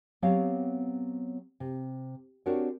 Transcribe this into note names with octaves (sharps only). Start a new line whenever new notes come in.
F#3 B3 C4 G4 C#5 F5
C3
C4 D4 F#4 G4 A#4 C#5